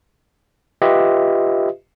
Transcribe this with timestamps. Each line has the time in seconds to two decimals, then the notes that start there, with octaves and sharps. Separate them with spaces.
0.82 F4 G4 B4 D#5 E5